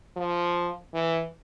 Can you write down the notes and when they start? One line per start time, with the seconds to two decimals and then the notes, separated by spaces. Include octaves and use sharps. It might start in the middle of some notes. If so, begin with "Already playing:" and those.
0.16 F3
0.94 E3